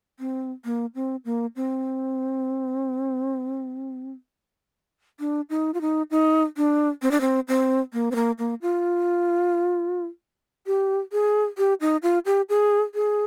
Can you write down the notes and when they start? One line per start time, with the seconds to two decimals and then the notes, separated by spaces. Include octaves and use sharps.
0.19 C4
0.65 A#3
0.95 C4
1.25 A#3
1.56 C4
5.20 D4
5.50 D#4
5.74 F4
5.81 D#4
6.11 D#4
6.57 D4
7.02 C4
7.11 D4
7.21 C4
7.48 C4
7.93 A#3
8.11 C4
8.15 A#3
8.39 A#3
8.62 F4
10.67 G4
11.12 G#4
11.58 G4
11.81 D#4
12.03 F4
12.26 G4
12.49 G#4
12.95 G#4